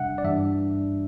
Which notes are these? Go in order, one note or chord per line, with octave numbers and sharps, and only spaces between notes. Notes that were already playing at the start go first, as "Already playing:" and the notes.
Already playing: E2 C3 G3 D4 E5 F#5
D5
G2 E3 G3 D4 E5